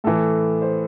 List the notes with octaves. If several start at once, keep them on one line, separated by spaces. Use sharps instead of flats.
A2 E3 A4
C5